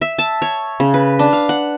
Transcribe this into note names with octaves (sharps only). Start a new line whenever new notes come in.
E5
A5
C#5
C#3
B4
D4
F5
F#5